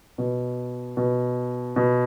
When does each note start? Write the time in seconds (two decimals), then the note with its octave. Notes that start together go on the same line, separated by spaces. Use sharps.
0.18 B2
0.97 B2
1.76 B2